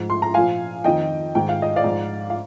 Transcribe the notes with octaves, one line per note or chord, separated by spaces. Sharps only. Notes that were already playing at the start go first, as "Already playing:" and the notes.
Already playing: G#2 F3
C6
A#5
A#2 F3 F5 G#5
F2 D#3 D#5 G5
G#2 D#3 G5
F5
D#5
D5 F5
G#2 F3
F5